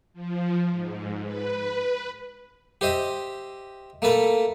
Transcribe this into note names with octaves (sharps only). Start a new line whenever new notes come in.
F3
G#2
B4
G4 C5 D#5 E5
A3 A#3 A4 B4